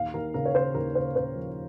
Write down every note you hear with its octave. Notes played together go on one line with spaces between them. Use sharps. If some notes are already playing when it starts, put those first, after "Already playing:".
Already playing: D#2 F5
D#2 A#4
C#3 A#4
C#5
C#3 C5
D#2 A#4
C#3 C5
C#3 C5
F3